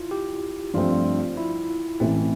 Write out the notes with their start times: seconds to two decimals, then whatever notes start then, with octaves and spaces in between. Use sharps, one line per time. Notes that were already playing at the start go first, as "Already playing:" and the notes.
Already playing: E4 F4
0.11 G4
0.74 G2 F3 A3 C4 F4
1.37 E4
2.00 A1 A2 E3 A3 C4 E4